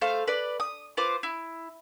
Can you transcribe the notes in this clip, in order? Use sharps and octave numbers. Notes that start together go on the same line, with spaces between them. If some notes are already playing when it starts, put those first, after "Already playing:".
A3 C5 F5
B4 D5
D#6
F4 B4 C5 D6
E4